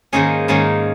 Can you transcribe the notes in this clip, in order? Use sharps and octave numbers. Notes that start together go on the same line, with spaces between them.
G#2 D#3 A#3 C#4 G#4
G#2 D#3 A#3 C#4 G#4